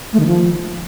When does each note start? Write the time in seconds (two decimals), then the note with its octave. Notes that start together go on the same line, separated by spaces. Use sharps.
0.13 A3
0.20 D#3
0.27 F3